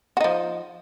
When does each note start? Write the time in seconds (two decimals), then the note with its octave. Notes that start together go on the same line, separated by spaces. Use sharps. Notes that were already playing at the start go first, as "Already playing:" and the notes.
0.17 F#4
0.21 D#4
0.24 F3